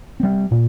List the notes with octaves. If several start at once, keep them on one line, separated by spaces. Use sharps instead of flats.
G3 C4
A#2